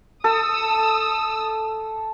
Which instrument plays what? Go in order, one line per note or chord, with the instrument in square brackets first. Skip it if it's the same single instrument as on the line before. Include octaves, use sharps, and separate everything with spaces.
[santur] A4 [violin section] D#6 E6